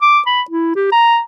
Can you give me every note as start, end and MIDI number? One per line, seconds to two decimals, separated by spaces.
0.02 0.20 86
0.27 0.41 83
0.51 0.72 64
0.76 0.89 67
0.92 1.19 82